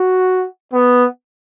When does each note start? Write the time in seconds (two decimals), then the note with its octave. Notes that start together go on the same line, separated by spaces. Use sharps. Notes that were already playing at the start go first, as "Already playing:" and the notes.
Already playing: F#4
0.73 B3